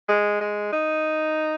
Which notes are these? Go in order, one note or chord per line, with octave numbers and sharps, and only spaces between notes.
G#3
G#3
D#4